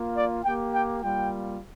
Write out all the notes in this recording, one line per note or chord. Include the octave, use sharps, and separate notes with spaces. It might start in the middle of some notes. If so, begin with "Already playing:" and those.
Already playing: A#3 F4
D5
A#3 G4 G5
G5
G3 A#3 F4 G5